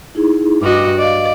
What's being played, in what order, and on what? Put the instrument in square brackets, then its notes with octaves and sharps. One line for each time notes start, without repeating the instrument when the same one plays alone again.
[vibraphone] D#4 E4 G#4
[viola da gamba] G2 F#4 D#5 [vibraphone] D6
[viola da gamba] D5 [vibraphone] D#5 F5